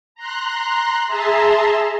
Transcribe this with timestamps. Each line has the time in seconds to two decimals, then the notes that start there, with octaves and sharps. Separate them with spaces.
0.15 A#5 C6 F#6
1.07 G#4 E5 A5 A#5 C6